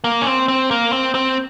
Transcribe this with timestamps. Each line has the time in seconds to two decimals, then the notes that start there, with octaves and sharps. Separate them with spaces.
0.04 A#3
0.21 C#4
0.26 C4
0.48 C4
0.71 A#3
0.93 C4
1.15 C4